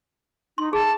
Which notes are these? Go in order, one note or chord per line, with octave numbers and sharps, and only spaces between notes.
D#4 C6
G#4 A5